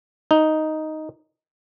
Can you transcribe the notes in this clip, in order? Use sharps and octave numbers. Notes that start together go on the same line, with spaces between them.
D#4